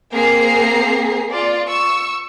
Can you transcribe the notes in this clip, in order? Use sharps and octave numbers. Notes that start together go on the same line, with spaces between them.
A#3 C4 G#4 A#5 C7
F4 D5
C#6 E6